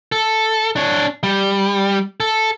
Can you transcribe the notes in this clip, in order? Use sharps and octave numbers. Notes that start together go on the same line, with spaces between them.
A4
D4 C#5
G3
A4